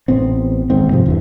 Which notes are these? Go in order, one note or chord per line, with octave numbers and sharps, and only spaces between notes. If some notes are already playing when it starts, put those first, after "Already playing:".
A1 A2 B3 C4
D#1 D#2 G#2 C4
G#2 C3 F3
E2 G2 E3